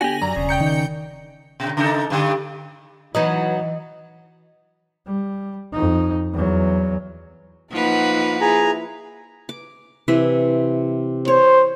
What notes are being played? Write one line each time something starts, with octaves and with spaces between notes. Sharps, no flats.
D3 B3 F#4 G4 G#5 A#6 F#7
F#2 D5 A#5
E1 C#3
G5 G6 C#7
D#3
B2 D3
C#3 D#4 A4
G2 D3 G3
E3 F#3 B3 D#4 D#5
G3
F2 D#4
E2 F#3
F3 A#3 D#4 B4 F#5
E4 G#4 A#5
D6
C3 E3 E5
C5 C#5